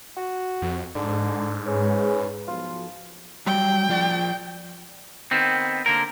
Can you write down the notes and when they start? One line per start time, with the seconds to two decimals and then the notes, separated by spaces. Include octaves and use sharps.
0.17 F#4
0.62 F2
0.95 G#2 D3
1.66 G#3 C#4 G#4 B4
2.48 B1 F3 F4
3.46 F#3 G3 G5
3.89 F3 F4 D5
5.31 D#3 B3 C4
5.86 D3 A#3 A#4